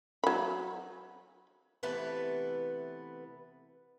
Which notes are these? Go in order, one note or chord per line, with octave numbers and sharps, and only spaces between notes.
F#3 B5
C3 E3 A3 B3 B4